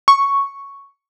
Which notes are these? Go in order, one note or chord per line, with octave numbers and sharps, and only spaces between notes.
C#6